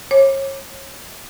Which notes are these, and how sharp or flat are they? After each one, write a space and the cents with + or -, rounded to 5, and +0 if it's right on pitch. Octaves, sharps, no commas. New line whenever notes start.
C#5 -35 D6 +0